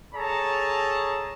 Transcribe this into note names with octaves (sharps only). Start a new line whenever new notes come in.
G#4 A4 C#5 A5 A#5